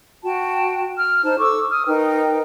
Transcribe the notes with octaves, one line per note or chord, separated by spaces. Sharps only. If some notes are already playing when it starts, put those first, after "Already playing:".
F#4 G5 A5
F6
D#4 C5 A5
A4 C#6 D6 E6
D#6 F6
D#4 A#4 B4 G5